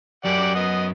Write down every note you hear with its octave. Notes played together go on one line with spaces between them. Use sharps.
F#2 F#3 G4 D5 F#5
B3 D#5